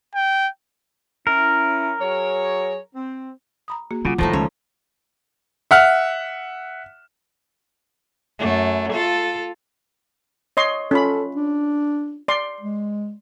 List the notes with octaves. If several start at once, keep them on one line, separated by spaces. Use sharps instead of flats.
G5
C#4 E4 A#4
F#3 G#4 C#5
C4
A#5 B5 D#6
A#3 F#4 G#4
C#3 G3 F4 F#5 D6
A2 D#3 F3 G3 A3 D#4
C#2 C#4 C#5
E5 F#5 F6
F#2 A3
F4 A4
C#5 D#5 C6
C#4 F4 A4 B5
D4
D5 C6
G#3